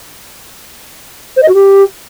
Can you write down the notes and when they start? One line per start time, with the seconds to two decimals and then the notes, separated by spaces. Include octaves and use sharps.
1.36 C5
1.42 D#5
1.48 F#4
1.54 G4